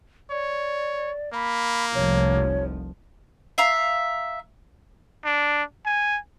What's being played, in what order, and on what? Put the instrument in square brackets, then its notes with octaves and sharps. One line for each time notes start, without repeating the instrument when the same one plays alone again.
[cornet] C#5 [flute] D5
[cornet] A#3 [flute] B5
[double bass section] F1 C2 F3 [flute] C#5
[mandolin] E5 F5 A#5
[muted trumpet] D4
G#5